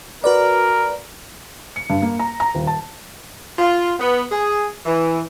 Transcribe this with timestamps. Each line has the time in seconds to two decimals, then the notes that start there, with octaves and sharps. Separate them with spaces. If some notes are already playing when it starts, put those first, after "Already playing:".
0.24 F#4 A#4 B4 D5
1.76 C#7
1.90 G2
2.02 A#3
2.19 A#5
2.40 A#5
2.54 D#1
2.67 A5
3.58 F4
3.99 B3
4.31 G#4
4.85 E3